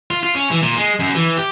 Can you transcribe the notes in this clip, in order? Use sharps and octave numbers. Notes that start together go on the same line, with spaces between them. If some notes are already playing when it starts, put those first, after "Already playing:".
F4
F4
C#4
E3
A#2
G#3
F#2
E3
G4